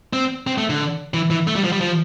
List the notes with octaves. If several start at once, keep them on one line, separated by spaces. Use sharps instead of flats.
C4
C4
A3
D3
E3
E3
A3
G3
F3
G3
F3